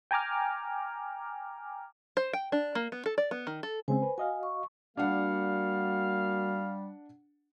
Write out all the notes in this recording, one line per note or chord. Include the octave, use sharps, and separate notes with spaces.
G5 G#5 A#5 D6 F6
C5
G5
D4
A#3
B3
A4
D5
B3
D#3
A4
C#3 G#3 C4 C5 G#5
B4
F#4 D#5 F5 G#5
C#6
G3 A#3 D4 F#4 F5 F#5